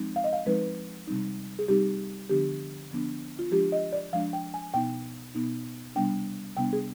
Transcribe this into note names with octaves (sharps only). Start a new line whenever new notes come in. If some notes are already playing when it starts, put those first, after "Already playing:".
Already playing: F3 G#3 C4 D#4
F5
D#5
F5
F3 G#3 C4 D#4 B4
C3 G3 C4 D#4
G#4
C3 G3 C4 D#4 G4
D3 F3 B3 D4 G4
D3 F3 B3 D4
F4
F3 G#3 D4 G4
D#5
D5
F3 G#3 D4 F5
G5
G#5
B2 B3 D#4 G5
B2 B3 D#4
C3 G3 B3 D4 G5
C3 G3 B3 D4 G5
G#4